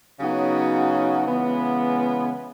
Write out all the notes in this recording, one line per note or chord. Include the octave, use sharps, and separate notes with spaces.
C#3 F#3 B3 D#4 F#4
C#3 E3 G#3 B3